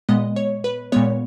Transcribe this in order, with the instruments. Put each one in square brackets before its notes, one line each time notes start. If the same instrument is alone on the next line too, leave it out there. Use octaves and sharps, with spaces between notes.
[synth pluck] A#2 G#3 B3 D#5
C#5
B4
A#2 G#3 B3 C#5